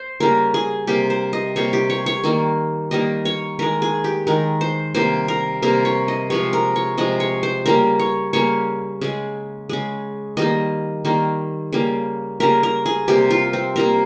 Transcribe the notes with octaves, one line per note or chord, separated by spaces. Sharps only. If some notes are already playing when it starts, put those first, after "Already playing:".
Already playing: C5
C#3 G3 A#3 A#4
G#4
C3 G3 A#3 G4
C5
D#5
C3 G3 A#3 C#5
G4
C#5
C#5
D#3 G3 A#3
D#3 G3 A#3 D#5
C#5
D#3 G#3 A#4
G#4
G4
D#3 G#3 A#4
C5
C3 G3 A#3 C5
A#4
C3 G3 A#3 A#4
C#5
D#5
C3 F3 G#3 C#5
A#4
C#5
C3 F3 G#3 D#5
C#5
C5
C#3 G3 A#3 A#4
C#5
C#3 G3 A#3 C#5
C#3 G#3
C#3 G#3
D#3 G3 A#3 D#5
D#3 G3 A#3
C#3 G3 A#3
C#3 G3 A#3 A#4
A#4
G#4
C3 G3 A#3 G4
F4
C4
C3 G3 A#3 A#4